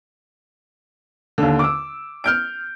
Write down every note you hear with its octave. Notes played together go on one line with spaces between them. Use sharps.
D#2 D3
D6 E6
F6 G6 D7